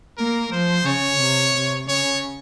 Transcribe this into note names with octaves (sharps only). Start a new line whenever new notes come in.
A#3 A#4
F3 C5
C#3 C#5
C3
C3
C#3 C#5